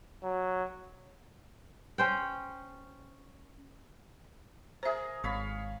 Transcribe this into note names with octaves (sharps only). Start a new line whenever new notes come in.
F#3
C#4 C5 G5
G#4 A#4 C5 E5
G#1 C#5 F5 B5